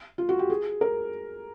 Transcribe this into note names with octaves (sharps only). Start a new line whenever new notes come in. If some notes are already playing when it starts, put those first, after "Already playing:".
F4
F#4
G4
G#4
A#4